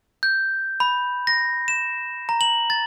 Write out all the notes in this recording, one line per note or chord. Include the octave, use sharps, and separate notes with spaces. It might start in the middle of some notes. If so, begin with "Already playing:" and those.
G6
B5
A#6
E7
A#5
F#7
A6